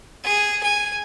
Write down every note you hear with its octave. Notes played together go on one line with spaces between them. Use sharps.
G#4
G#5